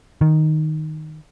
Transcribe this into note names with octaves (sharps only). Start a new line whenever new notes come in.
D#3